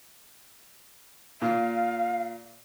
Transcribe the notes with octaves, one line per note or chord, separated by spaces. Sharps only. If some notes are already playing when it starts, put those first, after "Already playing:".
A#2 F5